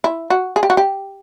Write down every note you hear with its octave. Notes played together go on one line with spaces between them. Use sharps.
E4
F#4
G#4
G4
F#4
G4